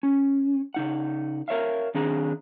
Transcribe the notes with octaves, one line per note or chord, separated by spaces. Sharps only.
C#4
C#3 D#4 F#5
A#4 C#5 E5 F5
D#3 C4 D4 G#4 A#5